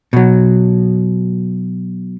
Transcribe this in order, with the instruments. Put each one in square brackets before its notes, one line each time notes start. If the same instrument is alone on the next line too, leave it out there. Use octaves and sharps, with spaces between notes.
[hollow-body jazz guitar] B2 F#3